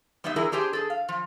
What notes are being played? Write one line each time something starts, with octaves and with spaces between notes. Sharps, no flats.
G3 B3 D#4 D#5 E5
D3 E3 E4 G#4 A#4
C4 D4 G4 G#4 C5 G5
G#4 A4
F5
F3